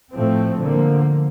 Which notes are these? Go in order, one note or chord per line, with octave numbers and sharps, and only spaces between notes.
A2 F3 A3 C4
D3 F3 A#3